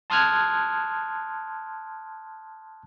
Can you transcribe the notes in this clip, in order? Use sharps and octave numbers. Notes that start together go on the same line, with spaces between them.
A5 C6 D#6 F6 F#6 G#6